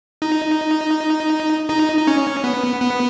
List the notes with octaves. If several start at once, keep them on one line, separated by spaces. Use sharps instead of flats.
D#4
D#4
D#4
C#4
B3
B3